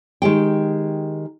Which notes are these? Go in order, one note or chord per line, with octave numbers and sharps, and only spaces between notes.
D#3 G#3 G4 G5